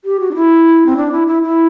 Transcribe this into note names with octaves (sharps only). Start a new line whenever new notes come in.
G4
F#4
D4
E4
C4
D4
E4
E4
E4